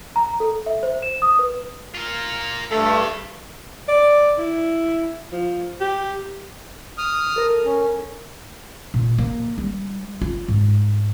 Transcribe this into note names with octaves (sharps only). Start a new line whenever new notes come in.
A#5
A4
E5
C5
E7
D#6
B4
F4 A#4
G2 A3 A4 F5 B5
D5
E4
F3
G4
D#6 F6
A4 A#4
C#4
A#2
A#3
G3
F4
G#2